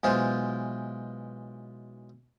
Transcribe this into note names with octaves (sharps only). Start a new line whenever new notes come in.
B1 E3 G#3 F4 C5